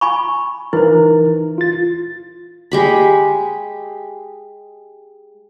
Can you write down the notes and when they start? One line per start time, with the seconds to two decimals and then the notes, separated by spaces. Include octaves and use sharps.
0.01 G#5 B5 C#6
0.73 E3 D#4 E4 A#4 C5
1.58 F4 A6
2.71 G#3 G4 B5